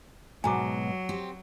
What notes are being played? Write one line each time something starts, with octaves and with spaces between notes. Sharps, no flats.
G#2 B2 F#3 G#5 A#5 D6
C4 G4